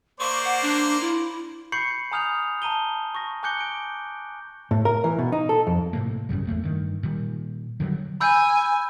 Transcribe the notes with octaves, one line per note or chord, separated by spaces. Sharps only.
A#3 C5 D5 C#6
F#5
D4
E4
B5 C#6 G6 C7 C#7 F#7
G#5 A#5 D#6 F6 G6 F7
A5 A#5 D#7 G7
C#6 A#6
G#5 D6 F#6 G6 C#7 G7
D7
A2
A#4
E3
B2
D#4
A4
F2
A2 C3 A#3
G#1 F#2 C#3 G3
E2 A2 A3 A#3
G2 D#3
A#2 D#3 G3
D3 D#3 F#3 G3
G#5 B5 E6 G6